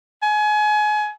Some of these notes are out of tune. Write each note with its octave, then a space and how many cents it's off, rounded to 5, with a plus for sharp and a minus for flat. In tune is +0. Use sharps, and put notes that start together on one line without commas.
G#5 +30